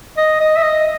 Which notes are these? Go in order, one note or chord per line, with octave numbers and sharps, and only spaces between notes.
D#5
D#5
E5
D#5